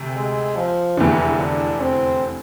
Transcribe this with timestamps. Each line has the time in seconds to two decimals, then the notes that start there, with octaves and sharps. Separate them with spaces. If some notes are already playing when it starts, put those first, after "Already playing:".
Already playing: D2 C3
0.16 G#3
0.56 F3
0.97 F1 E2 D3 E3
1.39 D4
1.80 C4